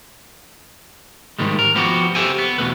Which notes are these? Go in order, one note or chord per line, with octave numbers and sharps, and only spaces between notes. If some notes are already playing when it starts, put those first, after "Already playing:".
G#2 C3 D#3 G3 G#3
A#4
F3 B3 F#4 G4
G4 A4 C5 E5 G5 G#5
B3
E2 B2 A3 B4